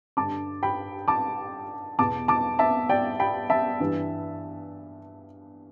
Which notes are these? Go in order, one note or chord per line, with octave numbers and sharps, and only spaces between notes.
G2 D3 A5 D6
G5 B5
A5 D6
E2 B2 A5 D6
A5 D6
E5 A5
D5 G5
G5 B5
E5 A5
G2 E3